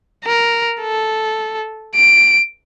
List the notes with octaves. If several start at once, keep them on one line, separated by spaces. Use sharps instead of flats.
A#4
A4
D7